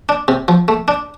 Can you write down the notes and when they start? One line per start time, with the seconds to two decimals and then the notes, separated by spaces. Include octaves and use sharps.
0.09 D4
0.28 C3
0.48 F3
0.68 A3
0.88 D4